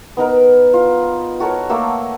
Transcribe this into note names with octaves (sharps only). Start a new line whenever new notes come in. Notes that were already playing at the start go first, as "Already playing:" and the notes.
B3 D#4 A#4
F4
F#4 A4 A#4 C#5
A3 A#3 F#4 E6